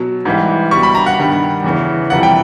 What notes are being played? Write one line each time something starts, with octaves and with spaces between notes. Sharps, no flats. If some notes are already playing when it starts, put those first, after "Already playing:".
Already playing: B2 F#3
G#2 E3 G3
B2 G3 C#6
B5
A#5
F#5
G2 D#3 G3
E2 C#3 E3
F2 C3 E3 G3 F#5
G5